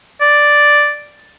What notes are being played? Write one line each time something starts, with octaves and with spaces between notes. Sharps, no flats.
D5